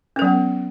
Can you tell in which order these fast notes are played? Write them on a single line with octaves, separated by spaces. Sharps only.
C#4 A#4 F#3 B3